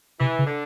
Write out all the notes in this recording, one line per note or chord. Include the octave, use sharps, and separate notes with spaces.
C3 E3
C#3
D3